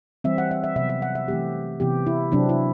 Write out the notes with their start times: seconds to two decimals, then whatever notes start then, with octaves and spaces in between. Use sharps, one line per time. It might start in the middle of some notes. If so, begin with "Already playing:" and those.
0.24 E3 G3 C4 E5
0.38 F#5
0.51 E5
0.64 E5
0.76 C3 F#3 B3 E5
0.89 E5
1.02 F#5
1.15 E5
1.28 E3 A3 C4 G4
1.80 C3 E3 B3 G4
2.07 E4
2.32 C3 F#3 C4 D4
2.49 E4